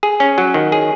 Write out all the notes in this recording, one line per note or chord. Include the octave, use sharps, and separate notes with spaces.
G#4
C#4
F#3
D#3
G#4